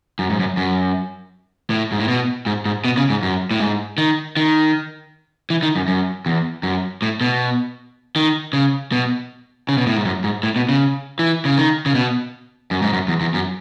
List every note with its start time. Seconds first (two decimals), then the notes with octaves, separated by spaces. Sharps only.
0.19 F#2
0.30 G#2
0.39 F#2
0.57 F#2
1.70 A2
1.92 G#2
2.00 A2
2.08 B2
2.46 G#2
2.66 G#2
2.85 B2
2.97 C#3
3.10 G#2
3.23 F#2
3.51 A2
3.60 G#2
3.98 D#3
4.37 D#3
5.50 E3
5.63 D#3
5.76 F#2
5.88 F#2
6.26 E2
6.63 F#2
7.02 A2
7.21 B2
8.16 D#3
8.53 C#3
8.92 B2
9.69 C#3
9.78 B2
9.87 A2
9.97 G#2
10.05 F#2
10.24 G#2
10.43 A2
10.56 B2
10.69 C#3
11.19 E3
11.45 C#3
11.57 D#3
11.86 C#3
11.95 B2
12.71 F#2
12.82 G#2
12.93 F#2
13.08 E2
13.21 E2
13.34 F#2